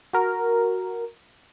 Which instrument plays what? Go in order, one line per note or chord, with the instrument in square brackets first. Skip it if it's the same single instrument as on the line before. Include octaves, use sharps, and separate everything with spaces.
[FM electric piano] F#4 A#4